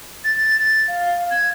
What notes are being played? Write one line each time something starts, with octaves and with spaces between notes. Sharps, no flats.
A6
F5
G#6